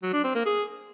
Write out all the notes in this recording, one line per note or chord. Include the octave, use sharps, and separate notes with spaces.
F#3
D4
C4
A#3
G#4